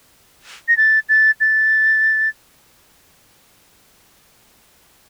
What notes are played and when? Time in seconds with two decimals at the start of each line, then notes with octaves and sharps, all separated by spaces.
0.68 A#6
0.77 A6
1.09 A6
1.40 A6